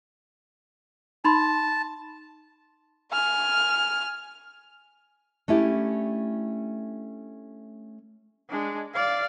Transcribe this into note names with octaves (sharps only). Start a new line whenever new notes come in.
D#4 A5 B5 C6
G#5 F6
A3 C#4 D4 E4 G4
G#3 D4
D5 F5